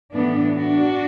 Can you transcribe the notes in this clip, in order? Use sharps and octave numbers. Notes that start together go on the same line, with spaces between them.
A2 E3 B3 D4
D4 F#4